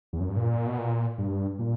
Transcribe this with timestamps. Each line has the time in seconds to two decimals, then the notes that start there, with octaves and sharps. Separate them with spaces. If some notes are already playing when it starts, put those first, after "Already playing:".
0.13 E2
0.20 F#2
0.29 G2
0.37 A#2
0.67 B2
0.78 A#2
1.18 G2
1.59 A#2